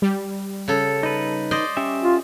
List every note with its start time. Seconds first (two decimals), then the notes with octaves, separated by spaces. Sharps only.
0.02 G3
0.68 C#3 A4
1.03 D#4 B4
1.51 C5 D5 D#5
1.77 C#4 G4 E5
2.04 F4